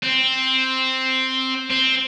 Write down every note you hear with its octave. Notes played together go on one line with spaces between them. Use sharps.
C4
C4